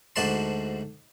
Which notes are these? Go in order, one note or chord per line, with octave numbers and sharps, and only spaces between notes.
D2 G#2 F#4 D5 A5 C6